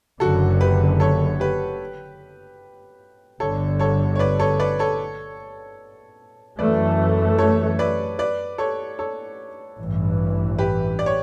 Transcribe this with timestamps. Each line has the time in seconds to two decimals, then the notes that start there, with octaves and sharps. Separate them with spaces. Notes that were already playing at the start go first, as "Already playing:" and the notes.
0.20 F#1 F#2 D3 F#4 A4
0.61 G4 B4
1.00 A4 C#5
1.40 G4 B4
3.40 G1 G2 D3 A4 C#5
3.80 A4 C#5
4.16 C#5
4.19 B4 D5
4.40 A4 C#5
4.60 B4 D5
4.79 A4 C#5
6.59 F#2 E3 A3 B4 D5
7.38 A4 C#5
7.79 B4 D5
8.19 B4 D5
8.58 A4 C#5
8.99 A4 C#5
9.79 A1 G2 E3
10.59 G4 B4
10.99 D5
11.06 C#5